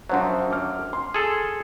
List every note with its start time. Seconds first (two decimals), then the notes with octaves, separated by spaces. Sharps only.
0.09 F#2 F3 F#3 D4 C5 F#5
0.51 D6 F6
0.93 C6
1.14 G#4 A4